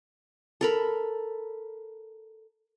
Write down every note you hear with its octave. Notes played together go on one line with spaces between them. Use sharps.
A4 A#4 B5